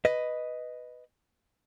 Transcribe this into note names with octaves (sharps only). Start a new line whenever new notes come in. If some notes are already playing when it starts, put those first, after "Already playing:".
B4 D#5